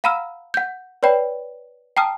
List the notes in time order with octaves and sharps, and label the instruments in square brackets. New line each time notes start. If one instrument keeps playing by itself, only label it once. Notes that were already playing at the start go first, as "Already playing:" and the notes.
[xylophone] F5 F#5 A#5 B5 E6 F6
F#5 G6
B4 C#5 D5 G5 B5
G5 A5 A#5 D#6 F6